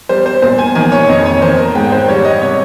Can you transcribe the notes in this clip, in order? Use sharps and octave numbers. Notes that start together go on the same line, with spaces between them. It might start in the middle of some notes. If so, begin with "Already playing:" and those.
G3 C5
C5
A#2 C5
G#5
D#3 G#5
C#5
F2 D#5
C#5
D#3 C5
A#4
G#2 G5
C5
G3 C#5
D#5
C3 C#5